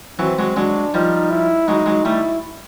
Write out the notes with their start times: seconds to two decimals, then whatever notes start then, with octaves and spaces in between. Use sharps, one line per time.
0.19 E3 F#3 C4
0.39 F#3 G#3
0.56 F#3 G#3 D4
0.94 F3 G3 D#4
1.30 E4
1.67 F#3 G#3 D#4
1.86 F#3 G#3
2.05 G3 A3 E4